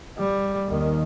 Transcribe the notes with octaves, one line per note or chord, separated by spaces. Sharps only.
G3
D#2 D#3